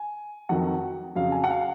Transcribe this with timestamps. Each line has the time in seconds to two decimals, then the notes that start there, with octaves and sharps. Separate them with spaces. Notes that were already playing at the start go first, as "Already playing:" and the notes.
Already playing: G#5
0.49 F2 D#3 F#3 F#5
1.15 F2 C#3 F#3 F5
1.32 G#5
1.44 F#5
1.50 F5